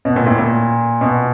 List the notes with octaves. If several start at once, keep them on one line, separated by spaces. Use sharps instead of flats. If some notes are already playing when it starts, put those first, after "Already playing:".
B2
A#2
A2
A#2
B2